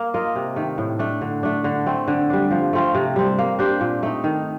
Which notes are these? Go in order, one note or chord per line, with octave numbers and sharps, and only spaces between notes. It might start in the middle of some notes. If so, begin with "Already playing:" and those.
Already playing: A#3
F4 A#4 D#5
C3
D#3 A3
A2
A3 D4
D3
A3 D4
D3
A3 C4
D3
G3 D4
F3
A3 C4 F4
C3
G3 C4
A#3
D4 G4 C5
A#2
A3 D#4
D#3